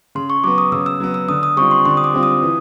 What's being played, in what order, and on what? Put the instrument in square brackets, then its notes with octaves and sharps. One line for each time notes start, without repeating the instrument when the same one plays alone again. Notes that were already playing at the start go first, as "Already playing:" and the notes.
[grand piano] C#3 [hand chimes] C6
[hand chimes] C#6
[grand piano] F#3 B3 [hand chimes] D6
[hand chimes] D#6
[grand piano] C#3 [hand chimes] E6
[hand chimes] E6
[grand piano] F#3 B3
[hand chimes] E6
[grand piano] D3 [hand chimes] D#6
[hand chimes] D#6
[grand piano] G3 C4 F4 [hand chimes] C#6
[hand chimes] C6
[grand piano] D3 [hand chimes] C6
[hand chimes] D#6
D6
[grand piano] G3 C4 F4
[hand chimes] D#6
[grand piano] E3